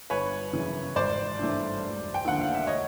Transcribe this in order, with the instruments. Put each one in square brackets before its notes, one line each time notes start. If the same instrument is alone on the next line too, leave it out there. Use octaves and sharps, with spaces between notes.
[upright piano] G1 B4 C#5
F#2 C#3 E3
G#1 C5 D5
G2 E3 A3
E1
G5
D#2 D3 F3 A3 F#5
F5
E5
C#5 D#5